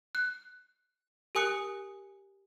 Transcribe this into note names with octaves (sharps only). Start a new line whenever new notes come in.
F#6
G4 A#4 G#5 D#6 F#6 C#7